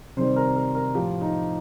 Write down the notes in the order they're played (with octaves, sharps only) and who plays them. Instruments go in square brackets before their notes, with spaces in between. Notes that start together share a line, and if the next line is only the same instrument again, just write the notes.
[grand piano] C3 D#3 G3 C5
A#4
A#4
A#4
A2 F3 G4
D#4